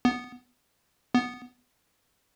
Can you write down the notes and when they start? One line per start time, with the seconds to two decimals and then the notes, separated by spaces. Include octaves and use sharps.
0.05 B3
1.14 B3